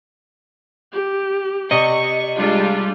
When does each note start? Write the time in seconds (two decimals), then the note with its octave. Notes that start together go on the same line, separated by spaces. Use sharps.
0.92 G4
1.71 C3 D5 D#5 C#6
2.37 G3 G#3 D4 F4